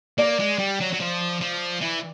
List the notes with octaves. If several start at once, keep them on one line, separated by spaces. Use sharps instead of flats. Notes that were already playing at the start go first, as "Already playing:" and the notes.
A#3 D5
G#3
G3
F#3
F#3
F3
F3
E3